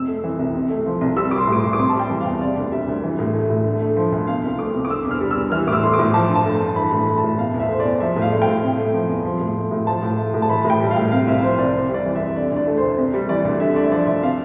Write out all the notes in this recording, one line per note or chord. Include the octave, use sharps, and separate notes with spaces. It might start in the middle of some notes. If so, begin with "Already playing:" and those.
Already playing: F2 C3 E6
A3
E3
C2
C3
A3
F3
C2
G3 E6
G3 D6
C6
A2
D6
A2 C6
D6
C3 C6
G3 A5
G5
E3
F5
E2
C3 D5
D2
G3 E5
D2
E3
A2
A3
A2
D3
A3
F3
D2
B2 F5
C2
A3 D6
C2
D6
D3 E6
E2
F6
G3
E6
E2
E3 F6
A2 D6
E6
A3 C6
D6
A2
F3 A5
G2
A5
A3
A5
G2
E3 B5
A2
B5
A3
A5
A2
B2 F5
E2
E5
A3 C5
D5
E2
F3 E5
A2
F5
A3
G5
A2
C3
A3
F3
E2
F3
A2
A3
A2
F3 A5
A2
A3
A2
A5
E3 B5
A2
G5
G3
F5
A2
C3 F5
C2 E5
F3 C5
C2 D5
C3 C5
G3
D5
E3
F2 E5
D3 D5
D2
D5
A3
D2 C5
C3
G3
E3 D5
D2
D3 E5
A3 D5
E5
F3 D5
D2 E5
C3 F5